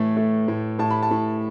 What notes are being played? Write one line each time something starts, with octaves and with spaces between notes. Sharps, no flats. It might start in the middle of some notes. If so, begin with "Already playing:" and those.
Already playing: A2 E3 A3
A3
A2
A2 A5
B5
A5
A2